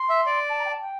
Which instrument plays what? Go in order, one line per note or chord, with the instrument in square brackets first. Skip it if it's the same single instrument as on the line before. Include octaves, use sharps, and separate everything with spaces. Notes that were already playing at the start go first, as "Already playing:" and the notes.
Already playing: [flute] C6
[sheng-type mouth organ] E5
D5
[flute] A5
A#5
G5
A5
G5